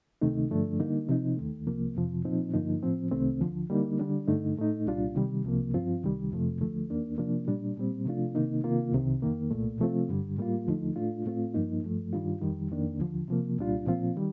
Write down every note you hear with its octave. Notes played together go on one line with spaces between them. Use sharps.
D2 C3 D#3 A3 D#4
G2 D3 F3 A3 D4
D3 G3 A#3 D#4
C3 F3 C4 D#4
D#2 D#3 A3
C2 C3 F3 A#3
F2 C3 F3
A#2 F3 C4 D#4
G2 D3 F3 A#3 D#4
A2 F3 C4
C2 C3 D#3 A3 C4
D2 D3 F3
D3 G3 A#3 D#4
D3 G3 D4
G2 D3 A3 D#4
A2 A3 D#4
C2 A#2 G3 D4 F4
C3 D#3 G3
C2 C3 F3 A#3
G2 F3 C4 F4
C2 C3 D#3 G3
F2 C3 F3 A3
D2 D3 F3 A3
D#2 D#3 A#3 D4
C3 F3 A#3 D4
A#2 G3 D4
A#2 G3 C4
C3 F3 A3 D4 F4
C3 D#3 A#3 D#4
C3 D#3 A#3 F4
C2 C3 D#3
F2 D#3 A#3
C2 A#2 A3
C3 F3 A3 C4 F4
G2 D3 G3
A2 G3 A#3 F4
D#2 D3 F3 A3 D#4
A2 A3 D4 F4
A2 A3 C4 F4
G2 F3 A#3 D#4
G2 F3 A3
G2 D#3 G3 D4 F4
F2 D#3 G3
F2 D#3 A#3 D4
D#2 D3 F3
C3 F3 A#3
C2 A#2 G3 D4 F4
A#2 F3 C4 F4
D#3 G3